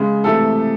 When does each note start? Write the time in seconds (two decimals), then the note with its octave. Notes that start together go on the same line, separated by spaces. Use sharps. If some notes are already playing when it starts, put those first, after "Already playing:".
Already playing: C#3 G#3
0.24 C3 E3 A3 A4